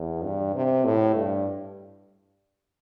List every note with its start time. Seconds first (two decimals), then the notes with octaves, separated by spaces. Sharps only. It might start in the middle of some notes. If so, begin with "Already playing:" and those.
Already playing: E2
0.24 G2
0.55 C3
0.85 A2
1.15 G2